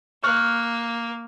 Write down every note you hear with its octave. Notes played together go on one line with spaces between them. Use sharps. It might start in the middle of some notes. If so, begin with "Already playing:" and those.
A#3 C#6 F6 F#6